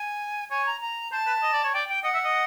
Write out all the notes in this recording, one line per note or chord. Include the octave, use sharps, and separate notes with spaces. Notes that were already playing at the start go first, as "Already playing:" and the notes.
Already playing: G#5
C#5 G#5
A#5
A#5
C5 A5
B4
D#5
D5
C#5
D5 G5
G5
D#5 F#5
E5
D#5